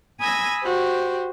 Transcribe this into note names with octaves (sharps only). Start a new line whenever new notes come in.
G#5 B5 D#6 E6 G#6 A#6
F#4 G4 C5